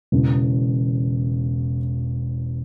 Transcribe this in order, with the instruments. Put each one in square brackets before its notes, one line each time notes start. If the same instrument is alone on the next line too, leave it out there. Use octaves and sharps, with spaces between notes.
[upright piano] E1 E2 C#3